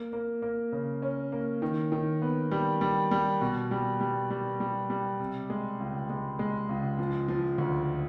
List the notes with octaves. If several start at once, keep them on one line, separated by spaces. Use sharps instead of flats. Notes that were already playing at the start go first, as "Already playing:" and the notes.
Already playing: A#3
A#3
A#3
C#3
C#4
A#3
D#3
D#3
B3
G3
G3
G3
B2
G3
G3
G3
G3
G3
C3
G#3
C#2
G#3
G#3
C#2
F3
F3
D2